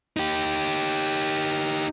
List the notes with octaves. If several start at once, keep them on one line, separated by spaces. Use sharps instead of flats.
D#4 G4